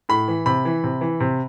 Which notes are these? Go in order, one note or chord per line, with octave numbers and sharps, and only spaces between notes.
A2 B5
E3
C3 B5
E3
C3
E3
C3